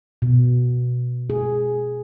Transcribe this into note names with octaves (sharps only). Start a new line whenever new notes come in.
B2
G#4